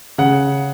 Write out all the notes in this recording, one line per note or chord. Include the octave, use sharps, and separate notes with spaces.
C#3 F#5